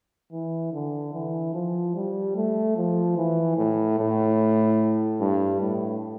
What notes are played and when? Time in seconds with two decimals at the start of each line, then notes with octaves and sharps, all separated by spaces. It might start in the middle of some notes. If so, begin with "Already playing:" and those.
0.32 E3
0.73 D3
1.14 E3
1.54 F3
1.95 G3
2.36 A3
2.77 F3
3.17 E3
3.58 A2
3.99 A2
5.21 G2
5.61 A2